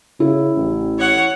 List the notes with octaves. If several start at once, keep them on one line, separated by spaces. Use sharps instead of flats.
C#3 E4
A1
C#5 F#5